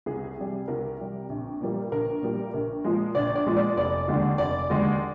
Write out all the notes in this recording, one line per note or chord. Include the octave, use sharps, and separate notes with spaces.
C2 G#4
C3 G3
C2 A#4
C3 G3
A#1
A#2 G3 A#3
A#1 A#4
A#2 G3 A#3
A#1 A#4
A#2 F3 G#3
A#1 D5
D5
A#2 F3 G#3
D5
F1 D5
D#2 D3 G#3
F1 D5
D#2 D3 G#3